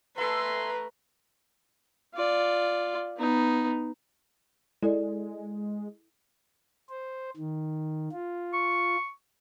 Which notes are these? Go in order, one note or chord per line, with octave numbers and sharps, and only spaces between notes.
A3 A4 B4 E5 G#5 A#5 C6
F4 D5
B3 D#4
G#3 E4 A4 D5
C5
D#3
F4
C#6